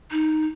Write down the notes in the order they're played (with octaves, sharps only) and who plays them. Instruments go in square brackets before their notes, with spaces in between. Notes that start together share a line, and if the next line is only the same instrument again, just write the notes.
[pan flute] D#4